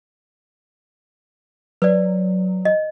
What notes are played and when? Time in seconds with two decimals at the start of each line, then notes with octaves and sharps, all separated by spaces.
1.82 F#3 B4 D5
2.65 D#5